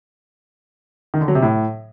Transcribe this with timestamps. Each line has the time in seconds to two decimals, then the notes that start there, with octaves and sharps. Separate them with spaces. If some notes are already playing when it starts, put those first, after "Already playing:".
1.14 D#3
1.21 D3
1.28 F#3
1.35 C3
1.42 A2